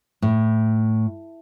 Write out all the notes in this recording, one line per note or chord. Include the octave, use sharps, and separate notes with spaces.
A2